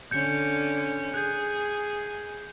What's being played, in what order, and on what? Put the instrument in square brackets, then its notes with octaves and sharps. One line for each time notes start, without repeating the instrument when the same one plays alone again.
[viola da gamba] D3 C#4 [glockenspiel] G6 C#7
[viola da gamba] G#4 [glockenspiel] F#6 G6